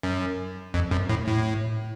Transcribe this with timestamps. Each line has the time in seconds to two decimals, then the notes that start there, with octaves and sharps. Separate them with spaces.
0.03 F#2
0.74 F2
0.91 F#2
1.09 A2
1.27 A2